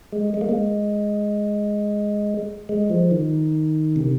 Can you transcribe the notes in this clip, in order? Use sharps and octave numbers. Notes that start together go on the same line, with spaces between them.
G#3
G#3
A#3
G#3
G#3
F3
D#3
C3